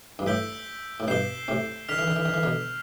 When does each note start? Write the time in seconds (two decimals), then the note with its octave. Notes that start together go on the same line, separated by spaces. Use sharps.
0.19 G2
0.26 A2 E6 G6 B6 D7 G7
1.00 A2
1.07 G2 B2 G6 C7 E7 G7
1.48 A2 C3
1.89 D3 F6 B6 F7
1.98 E3
2.07 D3
2.16 E3
2.25 D3
2.34 E3
2.43 B2 D3